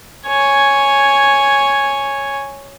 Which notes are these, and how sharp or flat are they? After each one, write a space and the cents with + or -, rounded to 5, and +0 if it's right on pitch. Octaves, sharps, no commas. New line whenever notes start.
C#5 +0 G#5 +0